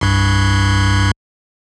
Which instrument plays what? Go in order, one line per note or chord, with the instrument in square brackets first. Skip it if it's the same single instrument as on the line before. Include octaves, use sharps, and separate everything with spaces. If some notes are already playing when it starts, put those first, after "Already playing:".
[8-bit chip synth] C2 G2